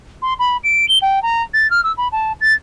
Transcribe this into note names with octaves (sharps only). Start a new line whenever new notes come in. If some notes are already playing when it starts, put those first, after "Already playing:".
C6
B5
D7
G7
G5
A#5
A6
F6
E6
B5
A5
A6